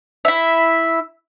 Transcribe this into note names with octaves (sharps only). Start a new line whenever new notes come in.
E4 E5